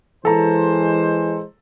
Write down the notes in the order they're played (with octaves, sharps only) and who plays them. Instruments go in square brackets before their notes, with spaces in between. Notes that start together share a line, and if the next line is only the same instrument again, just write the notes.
[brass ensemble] E3 G#3 C5 [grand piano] A4 A#5